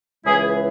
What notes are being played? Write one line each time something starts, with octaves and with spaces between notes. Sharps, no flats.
C#2 C#3 E3 G#3 E4 G#4